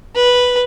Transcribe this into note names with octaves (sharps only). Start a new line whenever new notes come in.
B4